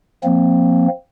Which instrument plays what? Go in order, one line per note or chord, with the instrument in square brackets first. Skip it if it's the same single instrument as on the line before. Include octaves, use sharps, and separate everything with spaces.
[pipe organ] F3 A#3 C4